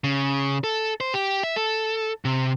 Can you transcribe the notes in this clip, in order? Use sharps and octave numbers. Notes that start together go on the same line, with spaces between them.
C#3
A4
C5
G4
E5
A4
C3